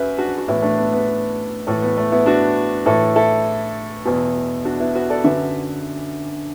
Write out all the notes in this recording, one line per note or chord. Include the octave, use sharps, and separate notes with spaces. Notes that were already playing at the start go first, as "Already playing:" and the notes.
Already playing: F#2 B4 E5
D4 F#4
F#4
A2 E3 B3 E4
A3 D4
B3
B3
A2 E3 A3
B3
A3
B3 E4
D4 F#4
A2 E3 E4 A4
E4 A4
E2 B2
D4 F#4
B3 E4
F#4 B4
A4 D5
F#2 D3 B4 E5